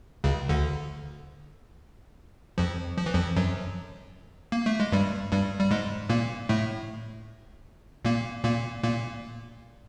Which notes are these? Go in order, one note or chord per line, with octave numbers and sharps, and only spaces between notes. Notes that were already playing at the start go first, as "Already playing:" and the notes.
C#2 C#3
D2 D3
F2 F3
F3
E3
F2 F3
F#2 F#3
A#3
A3
G#3
G2 G3
G2 G3
G3
G#2 G#3
A#2 A#3
A2 A3
A#2 A#3
A#2 A#3
A#2 A#3